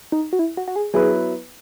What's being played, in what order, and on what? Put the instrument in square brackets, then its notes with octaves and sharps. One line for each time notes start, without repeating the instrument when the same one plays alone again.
[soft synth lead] D#4
F#4
E4
F#4
F#4
G#4
[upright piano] F#3 B3 E4 B4 [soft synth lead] G#4